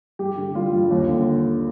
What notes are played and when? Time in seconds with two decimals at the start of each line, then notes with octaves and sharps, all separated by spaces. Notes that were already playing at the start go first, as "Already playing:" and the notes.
0.19 G2 G4
0.37 D3
0.55 G3 F4
0.73 G2
0.90 D#2
1.09 D3